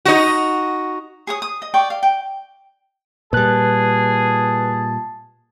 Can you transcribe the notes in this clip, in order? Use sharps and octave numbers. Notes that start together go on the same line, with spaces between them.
D#4 F#4
G#4 C#5 D#6
D#6
D#5
D5 G5 C#6
F5
G5
A#2 G3 G#4 B4 A5 F#6